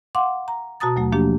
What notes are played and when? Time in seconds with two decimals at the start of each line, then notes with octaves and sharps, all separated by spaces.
0.15 F5 F#5 C6 D6
0.48 A#5
0.80 B2 F#4 A5 A#5 D#6 A6
0.96 D#2 F#3 A3
1.12 F3 A#3 D4 G4